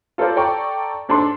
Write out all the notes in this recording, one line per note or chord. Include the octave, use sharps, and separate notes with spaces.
F4 A4 A#4 C5 D5
A4 D5 G5 A#5 C#6
G#2 D4 A4 C6